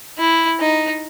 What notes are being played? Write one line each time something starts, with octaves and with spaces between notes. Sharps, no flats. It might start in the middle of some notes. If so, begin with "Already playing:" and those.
E4
D#4